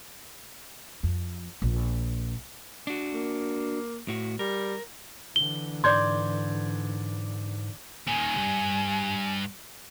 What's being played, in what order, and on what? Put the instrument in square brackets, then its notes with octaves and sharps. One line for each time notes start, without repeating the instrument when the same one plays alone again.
[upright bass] F2
A#1
[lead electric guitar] D4 F#4
[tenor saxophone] A#3
[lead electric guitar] A2 F#4
[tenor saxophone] G3 [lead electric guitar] A#4
[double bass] D3 E3 [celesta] G7
[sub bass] G#2 [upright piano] D5 G6 G#6 [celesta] C6
[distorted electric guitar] A#2 D#3 [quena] G#5
[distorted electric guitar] C2 G2